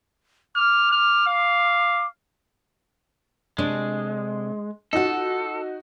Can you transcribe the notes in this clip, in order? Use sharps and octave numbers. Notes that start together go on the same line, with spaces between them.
D6 F6
F6
F5
C3 G#3 A3 D4
D#4 F4 F#4 A4 F#5